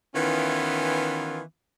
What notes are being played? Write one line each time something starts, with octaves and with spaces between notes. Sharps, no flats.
D#3 E3 B3 C#4 E4 F4